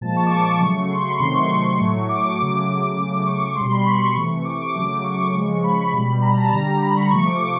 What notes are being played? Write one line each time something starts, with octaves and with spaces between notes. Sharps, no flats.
A#2 F3 G#3 A5
C#6
D6
C#6
C#3 F#3 A3
C6
C#6
B5
C3 D#3 F#3 A3 C6
C#6
A2 F#3 A3
D6
C#3 F#3 A3
C#3 F#3 A3
C#6
B2 G3 C6
B5
C#6
C3 E3 A3
D6
C#6
D6
C#3 F#3 A3
C#6
C#3 F3 G#3
B5
B2 G3
A#5
A5
D3 G3 A#5
B5
C#6
C3 F3 A3 C#6
D6